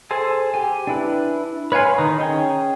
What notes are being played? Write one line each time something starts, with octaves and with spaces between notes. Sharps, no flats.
G#4 A4 C5 G#5
G4 G#5
D4 E4 B4
B4 C#5 F5 G#5 C6
D#3 D#4
C#4 G#4 G5